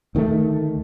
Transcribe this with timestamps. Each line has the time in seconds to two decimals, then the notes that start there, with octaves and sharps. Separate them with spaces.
0.15 D2 D#3 F3 A3